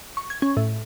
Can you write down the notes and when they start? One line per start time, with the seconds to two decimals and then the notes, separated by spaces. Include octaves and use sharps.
0.17 C#6
0.30 G#6
0.42 C#4
0.57 A2